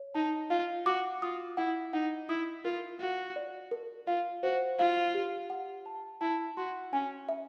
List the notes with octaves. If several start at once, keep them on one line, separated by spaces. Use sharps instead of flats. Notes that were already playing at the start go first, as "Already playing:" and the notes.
Already playing: C#5
D#4 A5
F4 F5
F#4 D6
F4 D#6
E4 F#5
D#4 F#5
E4 D#6
F4 A#4
F#4 F5
D5
A#4
F4 F5
F#4 C5
F4 F5
G4
F#5
A5
E4 A5
F#4 C6
C#4 G#5
E5